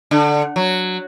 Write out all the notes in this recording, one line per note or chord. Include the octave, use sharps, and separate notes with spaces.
D3
F#3